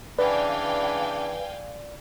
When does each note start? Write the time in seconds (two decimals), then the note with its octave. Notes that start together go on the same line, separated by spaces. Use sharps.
0.18 C#3 E3 D4 B4 D5 F5 G5 G#5